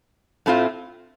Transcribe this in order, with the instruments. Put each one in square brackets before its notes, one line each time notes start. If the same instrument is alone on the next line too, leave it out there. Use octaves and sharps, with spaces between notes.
[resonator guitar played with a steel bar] A2 A3 C4 F4